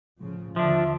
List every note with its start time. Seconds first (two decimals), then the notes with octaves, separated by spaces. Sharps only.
0.20 A2 C#3 F3
0.56 D#2 D3 F3 D4 E5